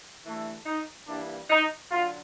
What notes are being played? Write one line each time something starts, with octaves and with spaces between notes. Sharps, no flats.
G2 E3 A3
D#4
G2 E3 G3 A#3 D4
D#4
D3 F#3 F4